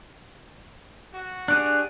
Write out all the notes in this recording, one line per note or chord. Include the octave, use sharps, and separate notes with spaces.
F#4
D4 G4 G#4 F#6